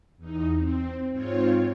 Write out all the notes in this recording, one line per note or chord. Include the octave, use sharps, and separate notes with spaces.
E2 D#4
C4
G#2 C4 F4 C#5